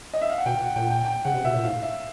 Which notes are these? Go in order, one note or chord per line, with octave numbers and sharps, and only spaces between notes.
D#5
E5
F5
F#5
B2 G5
F#5
A#2 G5
G5
G5
C#3 F#5
C3
B2 E5
A#2
A2 F5
E5